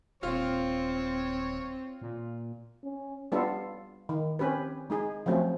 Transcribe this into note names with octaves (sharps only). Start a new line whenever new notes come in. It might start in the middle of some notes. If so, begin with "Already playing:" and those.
D#1 C4 F4 C#5 F5
A#2
C#4
G3 B3 D4 F4 A4
D#3
C4 C#4 G4 B4
G#3 D#4 G#4
F3 F#3 A3 C4 C#4